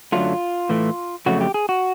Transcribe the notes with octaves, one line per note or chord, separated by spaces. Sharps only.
F#2 D3 F#3 A3 F4
A2 E3 A3
F2 C#3 F#3 A3 F#4
G4
G#4
F#4